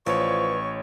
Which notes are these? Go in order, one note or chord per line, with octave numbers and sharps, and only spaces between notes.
A1 F3 B4 C#5 D5 C#6